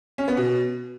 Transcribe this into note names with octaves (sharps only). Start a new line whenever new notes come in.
C#4
B3
B2